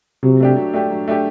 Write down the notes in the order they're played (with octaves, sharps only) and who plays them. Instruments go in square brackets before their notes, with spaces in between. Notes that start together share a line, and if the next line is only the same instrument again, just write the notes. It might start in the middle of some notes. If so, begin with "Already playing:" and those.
[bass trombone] C3 [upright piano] F#3
[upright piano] A3 D4 G4
F#3
A3 D4 G4
F#3
A3 D4 G4